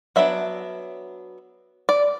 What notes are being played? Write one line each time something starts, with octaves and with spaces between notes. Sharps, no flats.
F#3 B3 D4 E5
D5